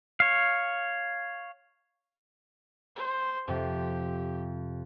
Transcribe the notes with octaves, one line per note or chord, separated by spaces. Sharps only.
C#5 F5
C5
F2 C3 G4